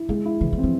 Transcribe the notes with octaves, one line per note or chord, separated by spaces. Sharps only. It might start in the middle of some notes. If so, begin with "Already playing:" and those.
Already playing: E4
D3 G#3
E4
C#3 E3
D3
C4
F3